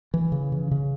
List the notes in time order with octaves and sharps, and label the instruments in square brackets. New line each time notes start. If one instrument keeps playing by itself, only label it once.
[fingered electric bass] E3
C#3
C#3
C#3